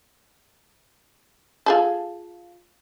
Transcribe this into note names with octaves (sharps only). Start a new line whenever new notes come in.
F4 G#4 A4